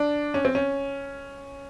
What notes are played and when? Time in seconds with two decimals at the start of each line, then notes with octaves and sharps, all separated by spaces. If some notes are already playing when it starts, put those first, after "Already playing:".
Already playing: D4
0.34 C#4
0.45 C4
0.55 C#4